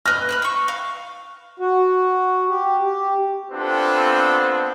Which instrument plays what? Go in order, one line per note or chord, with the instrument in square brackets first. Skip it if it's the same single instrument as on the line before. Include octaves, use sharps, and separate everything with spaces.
[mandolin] B4 D#5 [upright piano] F6
[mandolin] B5 E6 F#6
C#6 E6
F5
[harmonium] F#4
G4
G4
[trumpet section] B3 C4 D4 F4 A4